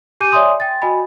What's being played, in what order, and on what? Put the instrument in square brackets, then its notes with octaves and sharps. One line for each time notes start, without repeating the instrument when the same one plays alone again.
[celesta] G4 G#5 D6 G6 D#7
C#5 D5 E5 G#5 C6 D#6
G5 A6
F#4 D#5 G#5 B5